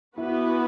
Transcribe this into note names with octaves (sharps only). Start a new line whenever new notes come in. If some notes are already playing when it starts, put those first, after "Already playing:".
E3 B3 E4 F#4 B4